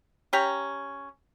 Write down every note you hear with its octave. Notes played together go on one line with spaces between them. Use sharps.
C#4 G4 A#5